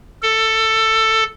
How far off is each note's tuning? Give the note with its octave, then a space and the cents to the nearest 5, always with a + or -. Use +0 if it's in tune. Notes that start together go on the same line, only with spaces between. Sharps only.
A4 +15